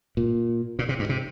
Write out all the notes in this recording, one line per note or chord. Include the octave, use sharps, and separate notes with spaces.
A#2
A#2
C3
G2
C3